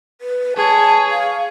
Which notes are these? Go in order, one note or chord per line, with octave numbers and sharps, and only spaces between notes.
B4
G#4 C#5 A5
F5